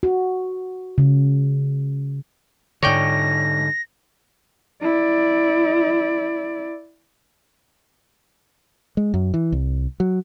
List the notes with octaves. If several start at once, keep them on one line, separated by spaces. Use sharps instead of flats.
F#4
C#3
G#2 D3 C#5 D5 G5 A#6
E4 D5
G#3
F#2
E3
C2
F#3